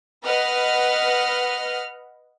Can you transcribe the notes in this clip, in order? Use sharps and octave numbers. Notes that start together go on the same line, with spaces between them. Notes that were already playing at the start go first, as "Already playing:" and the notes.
B4 D#5 F#5 F6